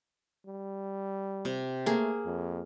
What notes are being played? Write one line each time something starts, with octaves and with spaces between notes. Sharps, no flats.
G3
C3
A3 A#3 G#4
F2